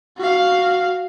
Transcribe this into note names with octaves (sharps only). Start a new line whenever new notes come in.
F#4 F5